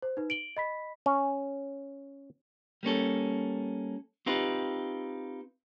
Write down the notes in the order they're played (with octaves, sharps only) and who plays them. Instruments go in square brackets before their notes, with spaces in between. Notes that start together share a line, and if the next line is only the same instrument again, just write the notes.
[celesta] C5
D#4 B4
D7 F#7 G7
D#5 B5 B6
[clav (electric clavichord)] C#4
[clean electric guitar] G3 A#3 C#4 A4
C4 D#4 F4 G4 B4